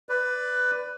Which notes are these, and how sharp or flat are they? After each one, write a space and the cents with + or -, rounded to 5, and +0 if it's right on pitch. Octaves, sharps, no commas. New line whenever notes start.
B4 +15 D5 +0